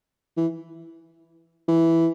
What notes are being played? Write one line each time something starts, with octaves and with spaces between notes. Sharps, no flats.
E3
E3